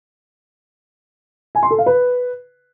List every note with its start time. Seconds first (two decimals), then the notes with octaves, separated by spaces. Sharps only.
1.55 G#5
1.63 C6
1.71 A4
1.78 F5
1.86 B4